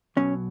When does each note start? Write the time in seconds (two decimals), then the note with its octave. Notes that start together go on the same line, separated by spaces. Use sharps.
0.17 B1 B2 F#3 C#4